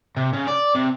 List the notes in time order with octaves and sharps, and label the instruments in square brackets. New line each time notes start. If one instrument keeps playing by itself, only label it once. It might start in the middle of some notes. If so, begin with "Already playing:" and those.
[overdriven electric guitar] C3
C#3
D5
C3